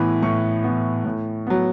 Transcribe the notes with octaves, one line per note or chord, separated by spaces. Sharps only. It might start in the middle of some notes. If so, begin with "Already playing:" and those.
Already playing: A2 E3 B3 B5
A2 C#6
E3 B3
A2
F#3 B3